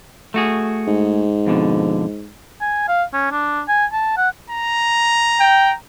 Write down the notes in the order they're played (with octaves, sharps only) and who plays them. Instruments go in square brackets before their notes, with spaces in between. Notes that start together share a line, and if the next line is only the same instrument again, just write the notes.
[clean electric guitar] A3 F#4 G#4
[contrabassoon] G#2
[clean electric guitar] F2 B2 D3
[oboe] G#5
F5
C#4
D4
G#5
A5
F#5
[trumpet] A#5
[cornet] G5